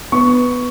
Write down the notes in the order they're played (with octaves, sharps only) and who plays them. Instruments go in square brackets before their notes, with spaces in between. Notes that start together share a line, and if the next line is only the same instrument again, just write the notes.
[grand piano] B3 C#6